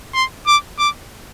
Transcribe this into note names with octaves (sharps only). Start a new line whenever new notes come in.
C6
D6
D6